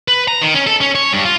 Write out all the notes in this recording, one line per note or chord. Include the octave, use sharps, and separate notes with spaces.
B4
A#5
D#3
C#4
A4
C#4
C#5
G2
F4